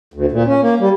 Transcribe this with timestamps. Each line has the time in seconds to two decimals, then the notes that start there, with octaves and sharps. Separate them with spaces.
0.14 D2
0.32 A#2
0.47 C#4
0.62 A#3
0.79 G3